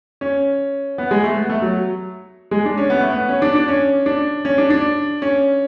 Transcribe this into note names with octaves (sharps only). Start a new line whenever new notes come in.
C#4
B3
G#3
A3
B3
A3
F#3
G#3
D4
C#4
B3
A3
B3
C#4
D4
D4
C#4
D4
C#4
D4
D4
C#4